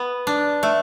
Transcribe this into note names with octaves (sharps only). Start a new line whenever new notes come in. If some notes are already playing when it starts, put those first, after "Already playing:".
Already playing: B3
D4
A3